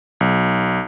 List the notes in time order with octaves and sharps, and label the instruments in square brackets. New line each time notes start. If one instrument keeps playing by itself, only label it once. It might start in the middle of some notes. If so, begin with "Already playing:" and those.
[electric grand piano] B1